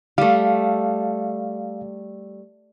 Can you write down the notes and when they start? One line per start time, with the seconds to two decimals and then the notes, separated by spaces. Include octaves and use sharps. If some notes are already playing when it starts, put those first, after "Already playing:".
0.18 G3 A3 F5